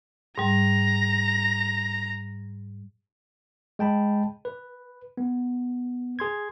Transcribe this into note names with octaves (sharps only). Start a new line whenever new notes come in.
G#2 G3 A#5
G#3 G5 A5 B5
B4
B3
G#4 C6 G#6